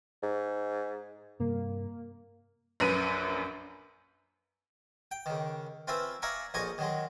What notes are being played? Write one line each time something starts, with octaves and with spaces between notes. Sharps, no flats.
G#2
G2 C3 G3 A#3
A#1 F#2 B4 D#7
G5
C#2 D#3
C4 C#4 F4 B4 E5
D5 E5 F5 G#5 A#5 C#6
A#1 F2 C#5 D#5 G#5 C#6
D#3 F#3 G#3